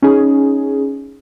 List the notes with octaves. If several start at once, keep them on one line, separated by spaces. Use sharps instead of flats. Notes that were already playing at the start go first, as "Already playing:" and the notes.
C#4 D#4 G#4